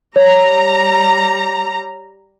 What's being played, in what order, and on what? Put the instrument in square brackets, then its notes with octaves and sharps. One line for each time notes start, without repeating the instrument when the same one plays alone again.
[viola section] G3 A#5 [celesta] C#5